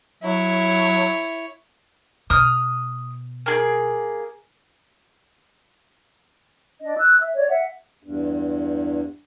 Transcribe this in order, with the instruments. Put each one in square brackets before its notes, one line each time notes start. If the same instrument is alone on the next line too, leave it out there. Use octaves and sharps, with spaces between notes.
[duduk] F#3 [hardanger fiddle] E4 C#5
[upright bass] B2 [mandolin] D#6 F6
[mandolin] A#3 G#4
[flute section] D4 D#5
E6 F#6
E5
C#5 D5
E5 F#5
[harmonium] E2 G2